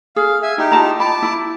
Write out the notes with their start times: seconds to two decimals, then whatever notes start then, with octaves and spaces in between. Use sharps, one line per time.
0.16 G#4 F5
0.43 E5 G#5
0.58 D#4 E4 G4
0.72 F4 A5 A#5
1.00 A5 B5 D6
1.23 E4